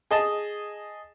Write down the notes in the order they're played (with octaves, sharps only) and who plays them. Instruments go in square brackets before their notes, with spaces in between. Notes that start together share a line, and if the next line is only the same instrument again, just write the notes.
[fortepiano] G#4 D#5 A5